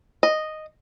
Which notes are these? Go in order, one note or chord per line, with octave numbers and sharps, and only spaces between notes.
D#5